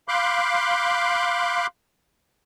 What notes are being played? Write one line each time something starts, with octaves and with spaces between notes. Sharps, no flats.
F5 B5 C6 D6 F#6 G6